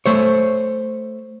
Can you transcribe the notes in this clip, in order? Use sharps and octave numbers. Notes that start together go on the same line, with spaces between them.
A3 C5 C#5